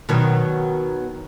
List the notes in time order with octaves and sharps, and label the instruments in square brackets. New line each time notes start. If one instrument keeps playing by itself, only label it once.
[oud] B2 D#3 F#3